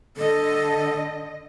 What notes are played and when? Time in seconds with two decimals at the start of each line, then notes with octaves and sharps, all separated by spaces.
0.17 D3 A4 D#5